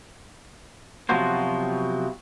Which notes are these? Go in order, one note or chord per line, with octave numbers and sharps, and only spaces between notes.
C3 F3 F#3 B3 F#4 C5